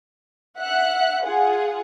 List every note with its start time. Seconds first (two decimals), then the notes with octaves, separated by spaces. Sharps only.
0.59 E5 F#5 F#6
1.25 F4 G#4 F#5